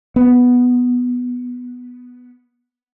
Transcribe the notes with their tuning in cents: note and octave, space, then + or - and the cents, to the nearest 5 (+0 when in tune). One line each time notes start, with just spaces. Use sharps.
B3 +0